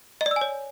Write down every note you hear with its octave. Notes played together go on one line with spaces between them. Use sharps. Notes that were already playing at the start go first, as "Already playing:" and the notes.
D#5
D5
E6
G#5
C#5